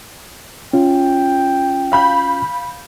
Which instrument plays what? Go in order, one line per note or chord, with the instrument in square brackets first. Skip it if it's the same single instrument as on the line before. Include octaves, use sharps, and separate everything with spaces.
[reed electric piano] C#4 F4 [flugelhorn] G5
[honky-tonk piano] F5 B5 G6